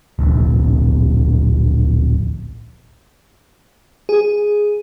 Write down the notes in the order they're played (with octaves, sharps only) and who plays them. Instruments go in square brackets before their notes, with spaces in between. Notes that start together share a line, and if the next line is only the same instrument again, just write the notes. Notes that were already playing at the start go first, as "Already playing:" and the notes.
[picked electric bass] D1 A#1
[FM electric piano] G#4